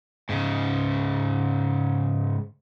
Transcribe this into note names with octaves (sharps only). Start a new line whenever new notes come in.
G#2 C#3